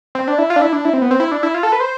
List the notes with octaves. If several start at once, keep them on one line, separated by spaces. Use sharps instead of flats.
C4
D4
E4
F4
D4
E4
D4
E4
C4
B3
C4
E4
D4
E4
F4
A4
B4
C5